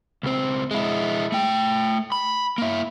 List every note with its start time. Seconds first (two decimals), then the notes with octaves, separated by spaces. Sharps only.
0.23 C#2 C4
0.71 G#3 E4
1.32 A3 G5
2.12 B5
2.58 A#3 E4